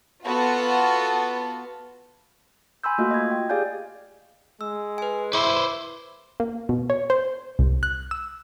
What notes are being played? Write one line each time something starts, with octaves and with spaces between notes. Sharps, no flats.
B3 F4 F#4 A4 B4
G#5 B5 C6 E6 G6
A3 A#3 F4 F#4 D#5
D#5 G#6
G5
G4 G#4 D5 F5 G#5 G6
G#3 E6
B4 G#5
E4 B4 C5 D6
A#3
B2
C#5
C5
C2
F#6
E6